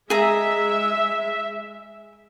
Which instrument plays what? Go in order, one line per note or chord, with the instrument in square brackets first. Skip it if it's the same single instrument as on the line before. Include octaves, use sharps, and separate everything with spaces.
[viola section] G#3 E5 [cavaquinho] G#4 A#5